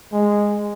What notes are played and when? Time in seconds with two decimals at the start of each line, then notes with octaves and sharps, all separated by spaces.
0.13 G#3